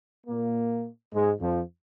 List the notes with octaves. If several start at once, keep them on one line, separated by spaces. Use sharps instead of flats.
A#2 A#3
G#2 G#3
F2 F3